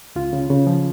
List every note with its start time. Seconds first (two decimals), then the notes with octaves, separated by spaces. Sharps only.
0.16 C#2 F4
0.33 C#3
0.50 C#3
0.67 F3